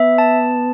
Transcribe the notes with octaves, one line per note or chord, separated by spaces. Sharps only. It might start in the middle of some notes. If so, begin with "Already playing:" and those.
Already playing: B3 E5
A5